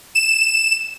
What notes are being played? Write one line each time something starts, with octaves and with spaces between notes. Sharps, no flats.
E7